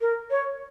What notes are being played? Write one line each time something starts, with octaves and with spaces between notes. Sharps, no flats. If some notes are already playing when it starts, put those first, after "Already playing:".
A#4
C#5